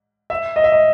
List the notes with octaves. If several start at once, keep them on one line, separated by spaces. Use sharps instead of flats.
E5
D#5
E5
D#5